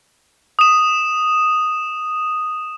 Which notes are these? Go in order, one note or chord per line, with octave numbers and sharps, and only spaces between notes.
D#6 E7